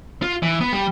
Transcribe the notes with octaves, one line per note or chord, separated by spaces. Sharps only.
F4
E3
B3
G3